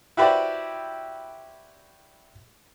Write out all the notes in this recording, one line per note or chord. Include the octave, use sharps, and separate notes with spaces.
E4 F#4 G4 B4 C5 D5